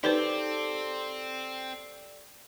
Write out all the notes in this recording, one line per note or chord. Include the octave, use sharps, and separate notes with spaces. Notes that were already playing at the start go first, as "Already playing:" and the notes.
C4 D#4 G4 A4 B4 C5 D5